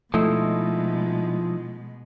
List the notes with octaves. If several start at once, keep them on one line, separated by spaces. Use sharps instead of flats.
B2 F3 G#3 A3 D#4 E4